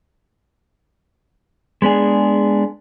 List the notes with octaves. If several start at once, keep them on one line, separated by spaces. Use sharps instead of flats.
G#3 B3 D4 G#4